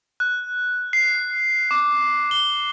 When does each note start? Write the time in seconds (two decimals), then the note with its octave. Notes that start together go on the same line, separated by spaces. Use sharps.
0.20 F#6
0.93 C7
1.71 D6
2.31 G7